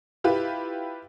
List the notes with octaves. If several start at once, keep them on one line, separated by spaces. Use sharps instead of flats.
E4 F4 G4 B4